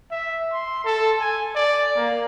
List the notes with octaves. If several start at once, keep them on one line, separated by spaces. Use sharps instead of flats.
E5
C6
A4
G#5
D5
A#3